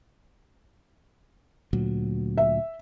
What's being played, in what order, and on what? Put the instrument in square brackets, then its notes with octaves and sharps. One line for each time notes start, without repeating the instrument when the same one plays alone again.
[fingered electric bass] D2 A#2 F#3
[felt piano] E5